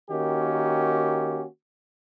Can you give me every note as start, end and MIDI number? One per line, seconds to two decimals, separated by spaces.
0.10 1.45 51
0.10 1.45 58
0.10 1.45 61
0.10 1.45 66
0.10 1.45 67